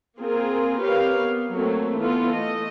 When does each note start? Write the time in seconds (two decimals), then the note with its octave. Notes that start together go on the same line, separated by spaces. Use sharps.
0.20 A#3 C4 F4 G#4 A#4
0.81 C4 G4 A#4 B4 C#5 F5
1.20 B3
1.54 F#3 A3 A#3 C4
1.98 E3 B3 F4 A4 B4
2.32 A3 D#5